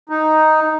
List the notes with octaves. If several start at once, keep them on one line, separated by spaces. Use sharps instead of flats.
D#4